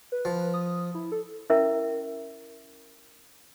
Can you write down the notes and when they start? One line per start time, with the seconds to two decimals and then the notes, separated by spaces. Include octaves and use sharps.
0.12 B4
0.25 F3
0.54 D#6
0.95 E4
1.12 A4
1.50 C#4 E4 A#4 E5